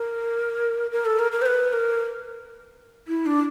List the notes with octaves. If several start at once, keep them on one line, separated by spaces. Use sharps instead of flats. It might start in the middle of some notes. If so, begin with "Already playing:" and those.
Already playing: A#4
A#4
A4
A#4
A#4
C5
B4
A#4
E4
D4